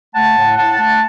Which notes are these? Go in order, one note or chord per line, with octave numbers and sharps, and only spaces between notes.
A3 F#5 A5
A2
A2 F#5 A5
A3